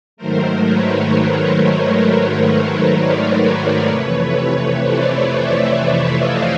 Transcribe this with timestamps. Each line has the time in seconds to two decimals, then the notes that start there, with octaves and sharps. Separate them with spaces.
0.17 G#2 D#3 F#3 A3 A#4 C5
0.63 B4 C#5
2.96 C5 D5
3.42 B4 C#5
3.88 F2 C3 E3 A3
4.80 C5 D5
5.27 D5 E5
5.73 D5 E5
6.19 D#5 F5